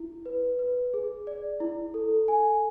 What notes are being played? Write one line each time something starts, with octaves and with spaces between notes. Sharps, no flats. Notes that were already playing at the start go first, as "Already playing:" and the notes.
Already playing: E4
B4
B4
G#4
D5
E4
A4
G#5